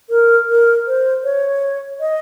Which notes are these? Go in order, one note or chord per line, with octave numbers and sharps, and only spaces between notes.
A#4
A#4
C5
C#5
D#5